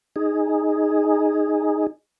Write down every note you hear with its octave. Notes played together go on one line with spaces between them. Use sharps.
D#4 G#4